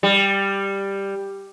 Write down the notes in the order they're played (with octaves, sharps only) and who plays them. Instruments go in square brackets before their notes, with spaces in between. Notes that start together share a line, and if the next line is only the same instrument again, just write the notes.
[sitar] G3